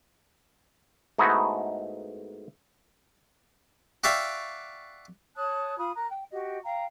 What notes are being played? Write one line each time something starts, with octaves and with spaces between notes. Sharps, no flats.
G#2 A3 B3 D#4 E4 F#4
F#4 D5 E5 F5 G5
C#5 A5 D#6 F#6
F4 B5 D#6
A#4 A#5 F#6
G5
F#4 G4 D#5
F5 G5 A#5